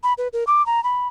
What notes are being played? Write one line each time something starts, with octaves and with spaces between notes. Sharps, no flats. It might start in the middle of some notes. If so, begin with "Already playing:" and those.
B5
B4
A#4
D6
A#5
B5